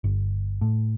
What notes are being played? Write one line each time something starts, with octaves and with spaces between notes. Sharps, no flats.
G1
A2